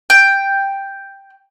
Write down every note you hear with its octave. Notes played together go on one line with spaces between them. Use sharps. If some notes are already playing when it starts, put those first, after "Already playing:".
G5